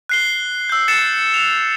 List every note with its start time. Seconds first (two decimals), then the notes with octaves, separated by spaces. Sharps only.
0.09 F#6 C7 G7
0.69 E6 G6
0.88 A6 C#7 E7
1.34 F7